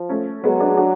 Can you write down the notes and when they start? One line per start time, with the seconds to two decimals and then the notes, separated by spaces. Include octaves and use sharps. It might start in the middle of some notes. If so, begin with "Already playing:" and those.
Already playing: F3
0.09 A3 C#4
0.44 F#3 G#3 B3
0.60 B3 D4
0.77 D4 F#4